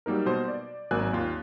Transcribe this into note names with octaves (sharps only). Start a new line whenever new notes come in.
F#3 G3 A#3 D#4 A#4
B2 C5
D5
G#1 F#3 A#3 G#5 F#6
D#2 F4